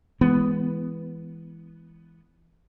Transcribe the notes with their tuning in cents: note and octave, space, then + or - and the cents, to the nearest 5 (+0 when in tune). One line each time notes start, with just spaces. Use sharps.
E3 +0 G#3 +0 B3 +0